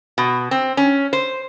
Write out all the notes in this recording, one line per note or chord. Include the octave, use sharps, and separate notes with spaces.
B2
C4
C#4
C5